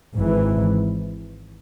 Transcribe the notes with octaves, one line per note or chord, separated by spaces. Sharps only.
G#1 G#2 E3